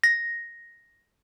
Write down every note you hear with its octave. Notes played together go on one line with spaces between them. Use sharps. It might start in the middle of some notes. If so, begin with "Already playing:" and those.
A#6